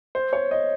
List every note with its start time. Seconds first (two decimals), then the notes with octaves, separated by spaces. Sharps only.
0.15 C5
0.33 C#5
0.51 D#5